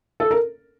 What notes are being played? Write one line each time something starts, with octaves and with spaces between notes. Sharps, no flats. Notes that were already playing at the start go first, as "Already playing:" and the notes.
A4
A#4